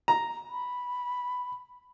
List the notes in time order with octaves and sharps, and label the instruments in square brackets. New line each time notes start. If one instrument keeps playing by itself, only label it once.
[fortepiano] A#5
[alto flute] B5